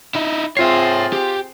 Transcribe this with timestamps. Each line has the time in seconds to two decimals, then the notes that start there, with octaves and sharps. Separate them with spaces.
0.15 D#4 E4
0.57 C4 F4 G#4 C#5 E5 C7
1.13 G4